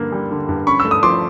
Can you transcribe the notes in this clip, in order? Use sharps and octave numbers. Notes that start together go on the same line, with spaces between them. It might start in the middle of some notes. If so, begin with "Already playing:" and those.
Already playing: G2 D3 A#3
G3
D3
G2
C#4 B5 C#6
E6
A3
D#6
F3 C6 D6